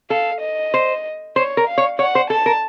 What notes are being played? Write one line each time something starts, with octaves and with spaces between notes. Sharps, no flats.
A4 F5
D#5
C5
C5 C#5
A#4
F5
C#5
C#5 F#5
C5
A4 A5
A#4